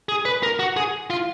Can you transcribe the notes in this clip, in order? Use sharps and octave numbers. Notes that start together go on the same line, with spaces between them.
G#4
B4
A#4
F#4
G#4
F4